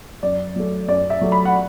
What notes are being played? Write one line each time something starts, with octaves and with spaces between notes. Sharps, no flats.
F#2 D5
F#3 A3
F#2 D5
E5
F#3 A3
B5
F#5